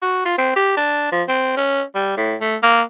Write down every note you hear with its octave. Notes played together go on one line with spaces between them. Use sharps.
F#4
F4
C4
G4
D4
F3
C4
C#4
G3
A2
A3
A#3